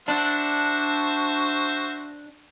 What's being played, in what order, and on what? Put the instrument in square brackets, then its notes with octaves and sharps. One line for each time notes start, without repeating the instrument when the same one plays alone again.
[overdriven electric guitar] D4 [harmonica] F#4 C5 E5